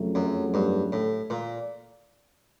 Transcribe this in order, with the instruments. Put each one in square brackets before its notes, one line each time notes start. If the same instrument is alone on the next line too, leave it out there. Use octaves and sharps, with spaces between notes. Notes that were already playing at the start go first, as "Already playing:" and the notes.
Already playing: [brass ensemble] F2 C#3 F#3 A3
[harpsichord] F#2
G2
A2
A#2